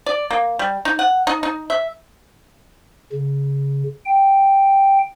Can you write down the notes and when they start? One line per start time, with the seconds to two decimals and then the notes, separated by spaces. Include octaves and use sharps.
0.06 D5
0.31 A#3
0.59 G3
0.85 D#4
0.99 F#5
1.27 D#4
1.43 D#4
1.70 E5
3.12 C#3
4.05 G5